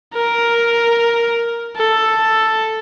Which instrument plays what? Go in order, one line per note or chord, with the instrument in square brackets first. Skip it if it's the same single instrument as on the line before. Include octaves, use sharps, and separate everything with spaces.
[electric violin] A#4
A4